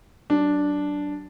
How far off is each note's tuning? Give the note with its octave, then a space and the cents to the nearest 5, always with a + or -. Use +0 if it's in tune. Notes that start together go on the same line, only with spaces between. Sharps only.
F#3 +35 D4 -5